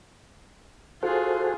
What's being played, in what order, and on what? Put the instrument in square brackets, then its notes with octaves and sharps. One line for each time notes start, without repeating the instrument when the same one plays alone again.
[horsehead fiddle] F4 G#4 [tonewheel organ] F#4 A4 C5